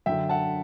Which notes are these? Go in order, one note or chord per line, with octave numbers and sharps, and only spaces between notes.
F#2 D3 E5 G5
F#5 A5